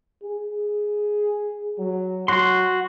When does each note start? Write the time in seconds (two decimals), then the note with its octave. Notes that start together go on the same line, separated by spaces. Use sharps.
0.23 G#4
1.79 F#3
2.28 F#3 F#4 C6